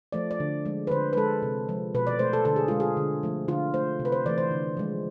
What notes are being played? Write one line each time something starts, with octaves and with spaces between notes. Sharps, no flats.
F3 A3 D5
D5
D3
F3 G#3
B4
D3 C5
B4
G#3 A4
C3
F3 G#3
B2 B4
D5
A3 C5
A4
D3 A4
G#4
G#3 F4
G#4
D3
F3 A3
D3 F4
A3 C5
C3
B4
C5
E3 A3 D5
C5
D3
F3 G#3